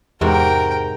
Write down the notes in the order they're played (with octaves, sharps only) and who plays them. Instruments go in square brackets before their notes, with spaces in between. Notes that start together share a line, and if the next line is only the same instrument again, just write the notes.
[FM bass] E2 [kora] G#2 C3 F#4 [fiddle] A#4 G5